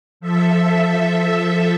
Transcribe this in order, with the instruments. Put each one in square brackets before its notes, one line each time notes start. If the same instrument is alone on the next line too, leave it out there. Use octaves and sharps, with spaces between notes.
[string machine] F3 A4 E5